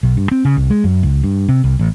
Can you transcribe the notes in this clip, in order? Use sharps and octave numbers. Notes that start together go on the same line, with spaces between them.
B1
G2
C4
C#3
C2
G#3
F#2
C#2
G2
C3
C2
A1